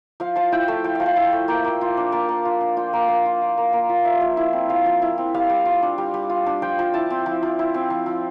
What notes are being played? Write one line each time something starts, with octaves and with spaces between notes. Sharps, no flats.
F3 F5
F3 A5
E4 G5
A3 A5
F3 G5
F3 F5
A5
E4 G5
A3
A#3 G5
A#3
F4
D4
A#3 A5
A#3
F4
D4
F4 G5
A#3
A#3
F4
F4
A#3
A#3
F4
F3 E5
F3
E4
C4
F3 F5
F3
E4
C4
G3 F5
G3
F4
D4
G3
G3
F4
D4
F3 G5
F3
E4 A5
C4
F3
F3
E4
C4
F3
F3